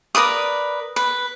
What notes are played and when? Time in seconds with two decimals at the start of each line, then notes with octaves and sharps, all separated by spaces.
0.15 A#4 B4 D5 D#6
0.96 B4